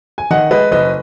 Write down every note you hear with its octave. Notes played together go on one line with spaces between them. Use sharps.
G#5
D#3 D#5 F#5
G#3 B4 D#5
F#1 B4 D#5